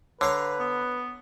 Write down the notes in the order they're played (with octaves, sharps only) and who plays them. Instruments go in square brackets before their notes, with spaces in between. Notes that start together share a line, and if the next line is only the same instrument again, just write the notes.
[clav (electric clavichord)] D3 [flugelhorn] B4 [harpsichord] C#5 F5 A#5
[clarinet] B3